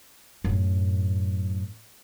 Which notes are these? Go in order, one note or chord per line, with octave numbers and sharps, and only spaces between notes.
F#2 A2